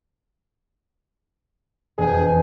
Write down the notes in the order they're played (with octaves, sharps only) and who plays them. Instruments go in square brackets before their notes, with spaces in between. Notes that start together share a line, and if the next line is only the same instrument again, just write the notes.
[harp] E1 F2 G5 [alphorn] G#4